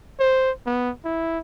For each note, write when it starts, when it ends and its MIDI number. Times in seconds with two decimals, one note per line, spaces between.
0.20 0.51 72
0.66 0.90 59
1.05 1.39 64